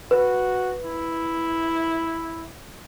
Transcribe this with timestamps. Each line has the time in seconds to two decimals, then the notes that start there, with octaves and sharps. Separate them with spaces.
0.11 F#4 B4
0.84 E4